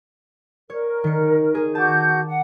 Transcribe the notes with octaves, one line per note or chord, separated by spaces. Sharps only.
A#4 C#5
D#3 C#7
G#4
F#4 F#5 A5 D6 G6
F#5